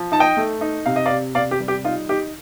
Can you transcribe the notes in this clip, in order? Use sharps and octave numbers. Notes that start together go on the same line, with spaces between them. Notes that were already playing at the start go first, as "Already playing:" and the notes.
Already playing: F3
D#4 A5
D#5 G5
A3
D#4
C3 F5
D#5
D5 F5
C3
C3 D5 F5
G4
G3
G4
D#4 F4
D#4 G4